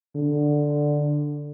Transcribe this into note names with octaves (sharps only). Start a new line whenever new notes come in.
D3